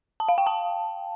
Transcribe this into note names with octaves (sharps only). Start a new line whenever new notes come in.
A5
F5
G5
A5